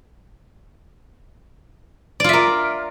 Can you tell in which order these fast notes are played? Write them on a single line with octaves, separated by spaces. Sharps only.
D5 F4 E5 A#4